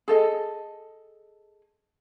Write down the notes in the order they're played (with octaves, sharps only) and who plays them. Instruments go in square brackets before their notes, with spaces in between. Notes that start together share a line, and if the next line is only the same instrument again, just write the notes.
[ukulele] G#4 A4 D#5